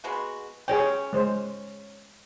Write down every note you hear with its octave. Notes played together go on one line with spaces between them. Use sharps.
G#3 B3 F#4
C#4 G#4 C#5 G5
G#3 C5